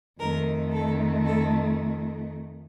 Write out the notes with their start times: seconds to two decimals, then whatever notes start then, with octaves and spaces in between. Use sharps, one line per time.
0.19 F2 D#3 A3 A#4
0.73 A4
1.26 A4